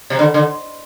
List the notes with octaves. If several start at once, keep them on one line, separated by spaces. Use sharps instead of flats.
C3
D3
D3